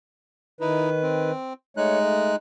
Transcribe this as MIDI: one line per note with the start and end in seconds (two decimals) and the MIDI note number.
0.61 1.31 51
0.61 0.90 63
0.61 0.90 64
0.61 1.31 71
1.02 1.53 60
1.77 2.36 56
1.77 1.98 57
1.77 2.36 63
1.77 1.98 73
1.77 2.36 90
1.99 2.32 57